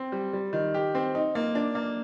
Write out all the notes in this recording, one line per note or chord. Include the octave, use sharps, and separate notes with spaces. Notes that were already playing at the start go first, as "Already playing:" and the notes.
Already playing: C4
G3
G3
D#3
G4
C4
D#4
A#3
D4
A#3